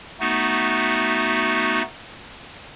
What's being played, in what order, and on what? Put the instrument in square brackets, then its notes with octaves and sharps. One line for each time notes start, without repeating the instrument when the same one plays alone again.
[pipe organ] A3 B3 D#4 F#4